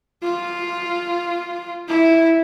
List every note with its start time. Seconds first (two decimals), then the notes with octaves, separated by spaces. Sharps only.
0.23 F4
1.88 E4